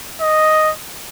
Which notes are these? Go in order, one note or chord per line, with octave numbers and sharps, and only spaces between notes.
D#5